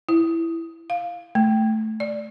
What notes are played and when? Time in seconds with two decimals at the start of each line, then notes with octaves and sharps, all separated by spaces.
0.09 E4
0.90 F5
1.35 A3
2.00 D5